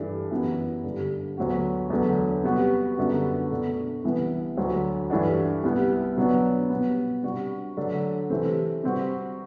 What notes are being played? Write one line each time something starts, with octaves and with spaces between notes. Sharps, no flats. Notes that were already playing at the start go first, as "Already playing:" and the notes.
Already playing: G2 E3 A3 D4
F#2 E3 B3 E4
G2 D3 G3
D2 D3 F#3 B3 F#4
E2 D3 F#3 A3
C3 G3 B3 F#4
F#2 D3 G3 B3 F#4
B2 A3 D4 F#4
C2 C3 E3 B3 E4
D2 D3 F#3
G2 E3 A3 D4 F#4
C2 C3 G3 B3 E4
B2 F#3 B3 D4
B2 G3 B3
C3 G3 D4 F#4
D3 F#3 A3 D4
C3 E3 A3 C4
C3 G3 C4 F#4